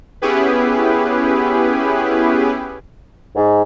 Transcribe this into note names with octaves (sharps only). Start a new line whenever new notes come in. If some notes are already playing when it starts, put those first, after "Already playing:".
B3 C#4 E4 G4 G#4 B4
G#2